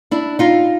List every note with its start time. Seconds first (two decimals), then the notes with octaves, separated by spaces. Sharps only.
0.11 D4 E4
0.39 D#4 F4